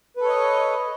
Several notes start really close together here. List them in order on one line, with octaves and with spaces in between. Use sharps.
B4 A4 C#5 D#5